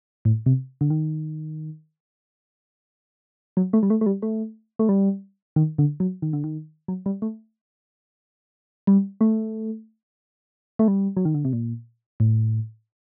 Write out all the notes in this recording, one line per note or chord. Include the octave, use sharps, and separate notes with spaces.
A2
C3
D3
D#3
F#3
A3
G3
A3
A3
G3
A3
A3
G3
D#3
D3
F#3
D#3
D3
D#3
F#3
G3
A3
G3
A3
A3
G3
F#3
D#3
D3
C3
A#2
A2